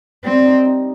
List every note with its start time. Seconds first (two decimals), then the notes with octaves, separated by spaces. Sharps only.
0.24 G3 C4
0.45 D#4
0.65 D#4